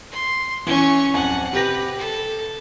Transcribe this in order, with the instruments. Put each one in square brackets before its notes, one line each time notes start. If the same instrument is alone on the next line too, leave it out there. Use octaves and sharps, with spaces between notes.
[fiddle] C6
[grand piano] E3 G7 [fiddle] C#4 C#6
[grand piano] D1 F2 G#5 [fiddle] F#5
[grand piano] C3 G4 A#6 [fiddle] B4
[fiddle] A4